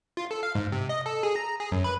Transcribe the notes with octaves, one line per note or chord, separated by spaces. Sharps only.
F4
A4
F5
G#2
C3
D#5
A4
G#4
A#5
G#4
F#2
B4